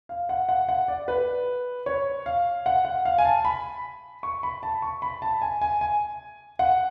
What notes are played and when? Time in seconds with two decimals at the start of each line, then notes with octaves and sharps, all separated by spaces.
0.09 F5
0.29 F#5
0.49 F#5
0.69 F#5
0.88 D5
1.08 B4
1.86 C#5
2.26 F5
2.66 F#5
2.85 F#5
3.05 F5
3.18 G#5
3.25 A5
3.45 B5
4.23 C#6
4.43 B5
4.63 A5
4.82 C#6
5.02 B5
5.22 A5
5.42 G#5
5.61 G#5
5.81 G#5
6.59 F#5